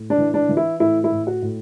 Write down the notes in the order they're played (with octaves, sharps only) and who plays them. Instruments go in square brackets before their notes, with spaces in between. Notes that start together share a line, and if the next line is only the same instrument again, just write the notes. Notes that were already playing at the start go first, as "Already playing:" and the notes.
Already playing: [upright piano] A2
D4
E3
D4
E3
E4
A2 E4
E4
A2
F#4
A2